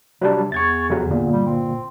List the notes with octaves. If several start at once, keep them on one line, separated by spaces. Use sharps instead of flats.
C3 F#3 G3 D4
E2 C#6 G#6 A6
F2 C3 F#3
G1 A#2
G3
C4